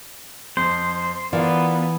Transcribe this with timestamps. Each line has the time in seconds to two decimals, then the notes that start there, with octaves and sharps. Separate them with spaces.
0.57 F2 C5
1.33 E3 B3 F4 A#4 D5